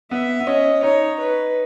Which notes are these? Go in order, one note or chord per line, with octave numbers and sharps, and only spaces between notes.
B3 E5
B3
C#4 D#5
D#4 C#5
B4